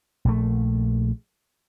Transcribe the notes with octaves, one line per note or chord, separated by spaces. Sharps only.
A#1 A3